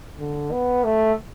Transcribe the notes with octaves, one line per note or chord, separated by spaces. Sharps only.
D3
B3
A3